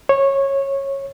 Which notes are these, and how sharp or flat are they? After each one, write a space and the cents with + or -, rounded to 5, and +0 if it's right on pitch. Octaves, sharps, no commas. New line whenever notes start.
C#5 -15